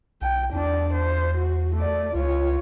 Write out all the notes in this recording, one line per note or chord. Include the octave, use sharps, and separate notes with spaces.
B1 G5
E2 D4 D5
C5
F#4
A3 D5
C#2 F4 C#5